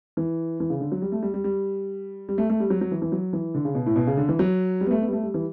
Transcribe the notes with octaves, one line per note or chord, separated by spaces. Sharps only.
E3
E3
C#3
D3
F#3
G3
A3
G3
G3
G3
G3
A3
A3
G3
F#3
F#3
E3
E3
F#3
E3
D3
C#3
B2
A2
B2
C#3
D3
E3
F#3
G3
B3
A3
B3
G3
A3
G3
E3